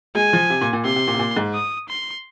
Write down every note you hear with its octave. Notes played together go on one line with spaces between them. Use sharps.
G#3 G#5
F3
C3
A#2
A#2
C3 C6
C3
A#2
C3
A#2
G#2
D#6
C6